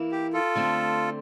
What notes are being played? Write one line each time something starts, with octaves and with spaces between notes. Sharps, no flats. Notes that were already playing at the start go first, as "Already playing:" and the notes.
Already playing: E3 A#3 E4
G4
F4 A4
D3 A3 C4